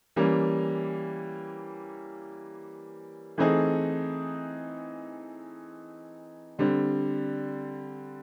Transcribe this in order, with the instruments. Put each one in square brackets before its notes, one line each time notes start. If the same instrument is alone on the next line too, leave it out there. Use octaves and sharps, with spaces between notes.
[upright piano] E3 G3 A#3 C#4
E3 A3 C4 D#4 G#4
D3 G3 C4